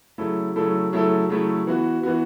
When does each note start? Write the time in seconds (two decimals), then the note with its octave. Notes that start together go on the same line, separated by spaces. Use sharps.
0.18 C#3 F#3 A3 E4 A4
0.56 C#3 F#3 A3 E4 A4
0.92 C#3 F#3 A3 E4 A4
1.29 C#3 F#3 A3 E4 A4
1.67 E3 B3 F#4
2.03 E3 B3 F#4